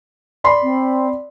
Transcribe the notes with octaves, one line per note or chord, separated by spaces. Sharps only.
D5 B5 C6
C4